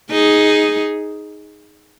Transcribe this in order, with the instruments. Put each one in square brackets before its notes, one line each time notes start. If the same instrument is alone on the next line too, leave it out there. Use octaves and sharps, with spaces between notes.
[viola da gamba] D#4 G#4